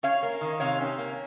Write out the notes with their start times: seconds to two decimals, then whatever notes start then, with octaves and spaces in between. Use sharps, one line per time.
0.03 C#4 C#5 F5
0.23 A#3
0.41 D#3
0.60 C3 C#5 F5
0.80 C#4
0.98 A#3